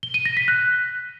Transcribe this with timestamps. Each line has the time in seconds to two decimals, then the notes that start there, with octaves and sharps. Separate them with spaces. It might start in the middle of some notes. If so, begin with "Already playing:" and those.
0.03 G7
0.14 D#7
0.25 A#6
0.37 B6
0.48 F#6